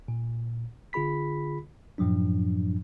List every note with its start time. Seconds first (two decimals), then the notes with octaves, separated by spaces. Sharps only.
0.08 A#2
0.93 D3 F4 G#4 B5 B6
1.98 F#2 A2 F3 F#3 D4